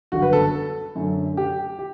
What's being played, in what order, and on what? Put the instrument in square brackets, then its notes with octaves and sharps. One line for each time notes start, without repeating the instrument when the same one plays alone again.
[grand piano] G1 F#2 D3 [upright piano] F#4
[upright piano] B4
A4
[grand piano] F#2 D3 F#3 A3 C#4
[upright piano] G4
[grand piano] G4